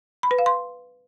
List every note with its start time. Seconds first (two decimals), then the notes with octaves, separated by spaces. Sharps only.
0.23 B5
0.31 B4
0.39 F5
0.46 C6